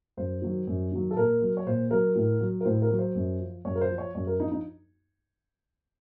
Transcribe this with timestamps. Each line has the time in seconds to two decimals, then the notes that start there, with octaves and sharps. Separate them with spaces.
0.17 F#2 C5
0.42 D#3 F#3
0.67 F#2
0.92 D#3 F#3
1.11 A4
1.17 A#2 A#4
1.41 F#3
1.57 C#5
1.66 A#2 C5
1.91 F#3 A#4
2.15 A2
2.41 F#3
2.61 A#4
2.65 A2 C5
2.82 A#4
2.91 F#3
2.99 C5
3.15 F#2
3.40 F3
3.65 F#2 C#5
3.75 A#4
3.81 C5
3.90 F3
3.98 C#5
4.15 F#2 C#5
4.27 A#4
4.39 F3 D#4
4.52 D#4